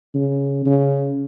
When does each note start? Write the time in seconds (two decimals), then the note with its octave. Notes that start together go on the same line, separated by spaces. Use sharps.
0.14 C#3
0.66 C#3